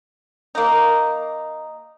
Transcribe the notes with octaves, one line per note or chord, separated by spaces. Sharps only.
A#3 D#4